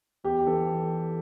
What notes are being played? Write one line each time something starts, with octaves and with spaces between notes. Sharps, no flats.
E2 G4
E3 A4